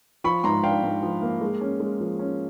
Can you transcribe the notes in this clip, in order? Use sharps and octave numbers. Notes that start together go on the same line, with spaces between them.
F3 B5 C#6
G#2 A#5 C6
D4 F5 G5
G#2
F3
A#3
G#3
C#4
G#3
F3
C#4